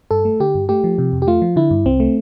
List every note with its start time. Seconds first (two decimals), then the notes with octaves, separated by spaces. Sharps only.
0.11 G2 A4
0.25 A3
0.40 D3 G4
0.55 G2
0.69 A3 G4
0.84 F3
0.98 C3
1.13 F2
1.22 G4
1.27 A3 F4
1.42 F3
1.56 D3 E4
1.71 G2
1.85 C2 C4
2.00 A3